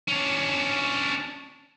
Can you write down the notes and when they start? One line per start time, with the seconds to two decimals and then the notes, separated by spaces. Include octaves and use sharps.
0.08 C#4 D4